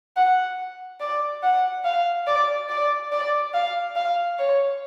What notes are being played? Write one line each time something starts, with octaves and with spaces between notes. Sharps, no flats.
F#5
D5
F#5
F5
D5
D5
D5
F5
F5
C#5